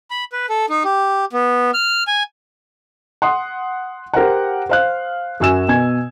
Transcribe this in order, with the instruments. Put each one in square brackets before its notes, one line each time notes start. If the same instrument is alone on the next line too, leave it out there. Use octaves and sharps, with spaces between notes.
[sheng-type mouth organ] B5
B4
A4
D#4
G4
B3
F6
G#5
[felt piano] F#5 C6 D#6
G4 A#4 C5 F#5
C5 F5 F#6
F#2 F#4 G#5 E6 E7
B2 G#5 G#6